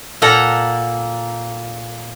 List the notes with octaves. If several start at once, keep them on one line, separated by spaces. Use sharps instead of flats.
A#2 A#3 A4 F#5 A#5